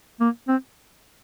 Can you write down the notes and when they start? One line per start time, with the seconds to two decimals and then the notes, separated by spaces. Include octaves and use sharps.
0.21 A#3
0.48 C4